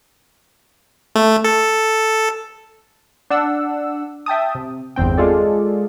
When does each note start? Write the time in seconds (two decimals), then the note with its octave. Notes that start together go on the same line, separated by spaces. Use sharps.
1.16 A3
1.44 A4
3.30 D4 F#5 E6
4.26 E5 G5 A5 D#6
4.55 C3
4.96 G1 E2 C4 G5
5.18 G#3 F4 G#4 A4 D5